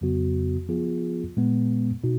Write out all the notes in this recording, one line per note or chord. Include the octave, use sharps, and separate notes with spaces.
F2 C#3 F#3 B3 F#4
F3 B3 F4 G#4
A#2 G#3 B3
B2 D#4 F#4